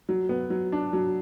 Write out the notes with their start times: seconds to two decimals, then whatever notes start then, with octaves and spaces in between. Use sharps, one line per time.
0.09 F#3
0.29 B3
0.50 F#3
0.72 D4
0.93 F#3